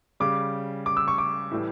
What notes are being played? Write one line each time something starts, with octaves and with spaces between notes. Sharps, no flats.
C#3 G3 D6
D6
E6
C#6
D6
A2 E3 G3